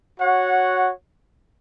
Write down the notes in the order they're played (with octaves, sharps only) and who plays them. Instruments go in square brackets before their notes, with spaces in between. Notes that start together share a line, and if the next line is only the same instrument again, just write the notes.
[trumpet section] F#4 C#5 F#5